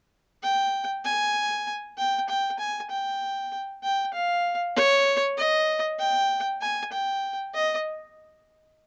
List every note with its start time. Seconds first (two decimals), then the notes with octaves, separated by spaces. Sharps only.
0.43 G5
1.05 G#5
1.97 G5
2.29 G5
2.59 G#5
2.90 G5
3.83 G5
4.13 F5
4.76 C#5
5.38 D#5
5.99 G5
6.61 G#5
6.92 G5
7.54 D#5